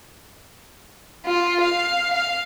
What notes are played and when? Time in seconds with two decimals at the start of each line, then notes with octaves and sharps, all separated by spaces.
1.25 F4
1.60 F5
2.13 F5